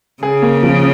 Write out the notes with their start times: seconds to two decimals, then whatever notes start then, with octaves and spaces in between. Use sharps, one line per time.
0.23 C#3 G#4
0.42 A#3
0.63 F3